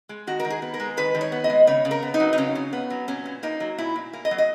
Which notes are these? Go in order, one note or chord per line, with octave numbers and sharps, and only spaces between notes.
G#3
D#3 F#4
A#4
D#3
G#4
B3
A#4
G#3
D#3 B4
D#3
C#5
B3
D#5
G#3
C#3 C#5
C#3
A#4
B3
D#4
F#3
D#4
C#3 C#4
C#3
B3
F#3
A#2 C#4
A#2
A#3 D#4
F#3
A#2 E4
A#2
A#3
D#5
F#3
D#5